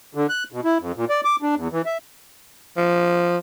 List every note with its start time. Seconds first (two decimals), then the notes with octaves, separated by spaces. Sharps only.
0.15 D3
0.29 F#6
0.52 B2
0.64 E4
0.79 F2
0.96 A#2
1.09 D5
1.25 D6
1.42 D4
1.56 E2
1.72 E3
1.86 E5
2.77 F3